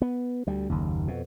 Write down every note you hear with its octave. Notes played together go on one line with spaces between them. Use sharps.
B3
D2 G3
F#1 D#2
F2 B2